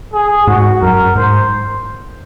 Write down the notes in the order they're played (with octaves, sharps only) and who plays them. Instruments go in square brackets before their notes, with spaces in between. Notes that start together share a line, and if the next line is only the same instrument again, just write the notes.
[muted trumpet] G#4
[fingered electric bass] G#2 [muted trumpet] F#4
[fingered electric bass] F#2 [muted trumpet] A#4
[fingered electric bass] G#2 [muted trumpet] C5